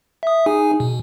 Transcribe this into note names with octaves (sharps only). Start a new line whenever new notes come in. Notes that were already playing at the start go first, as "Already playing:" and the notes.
E5 D#6
D#4 G#4 G#5
B2